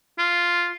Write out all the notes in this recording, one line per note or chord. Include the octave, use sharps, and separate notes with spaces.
F4